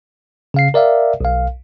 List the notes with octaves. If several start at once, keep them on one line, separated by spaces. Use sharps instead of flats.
C#3 F5 C7
A#4 D5 E5 F5
B1 F5